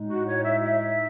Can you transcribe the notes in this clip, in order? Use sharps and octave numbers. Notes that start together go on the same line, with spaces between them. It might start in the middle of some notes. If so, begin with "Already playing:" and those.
Already playing: A2 G#3 D#4
F#4
C#5
E5
E5